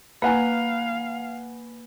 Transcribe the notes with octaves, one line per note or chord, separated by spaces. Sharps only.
A#3 B4 F5 F#5 G#5